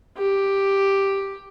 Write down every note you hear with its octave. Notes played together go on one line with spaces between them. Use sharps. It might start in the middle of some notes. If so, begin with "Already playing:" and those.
G4